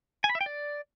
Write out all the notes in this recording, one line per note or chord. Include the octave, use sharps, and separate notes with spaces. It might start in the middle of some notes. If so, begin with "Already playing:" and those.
G#5
B5
E5
G5
D5